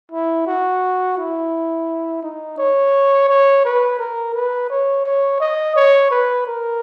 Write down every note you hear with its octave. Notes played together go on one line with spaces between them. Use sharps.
E4
F#4
E4
D#4
C#5
C#5
B4
A#4
B4
C#5
C#5
D#5
C#5
B4
A#4